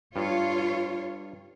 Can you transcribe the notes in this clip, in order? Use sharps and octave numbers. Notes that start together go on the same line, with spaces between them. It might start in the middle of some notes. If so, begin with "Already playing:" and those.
G2 F4 C#5